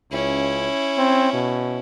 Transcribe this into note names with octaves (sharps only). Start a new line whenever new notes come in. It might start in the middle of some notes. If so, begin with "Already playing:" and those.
C#2 C#4 E4
C4
B2